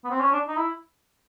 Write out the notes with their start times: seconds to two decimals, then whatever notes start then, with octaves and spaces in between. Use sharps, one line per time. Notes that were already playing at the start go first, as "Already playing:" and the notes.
0.04 B3
0.11 C4
0.21 C#4
0.32 D4
0.48 D#4
0.57 E4